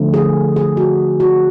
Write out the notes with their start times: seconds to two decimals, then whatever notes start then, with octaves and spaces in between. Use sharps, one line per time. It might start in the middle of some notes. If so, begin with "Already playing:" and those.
Already playing: D3 F3 A3
0.14 G#4
0.56 G#4
0.77 F#4
1.20 F#4